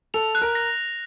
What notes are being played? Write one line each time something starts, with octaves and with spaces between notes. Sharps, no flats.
A4 F7
F#6
A#4
A#6